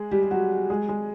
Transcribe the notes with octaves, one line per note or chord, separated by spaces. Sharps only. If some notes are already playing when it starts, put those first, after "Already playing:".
Already playing: G#3 G#4
G3 G4
G4
F#3 F#4
G#3 G#4
G#3 G#4